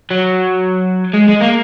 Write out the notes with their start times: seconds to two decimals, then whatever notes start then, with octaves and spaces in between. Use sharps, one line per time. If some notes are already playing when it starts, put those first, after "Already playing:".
0.11 F#3
1.14 G#3
1.29 G#3
1.41 A#3